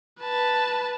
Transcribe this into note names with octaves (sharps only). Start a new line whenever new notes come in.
B4 A5